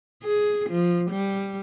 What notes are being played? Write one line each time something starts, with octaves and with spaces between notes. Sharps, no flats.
G#4
F3
G3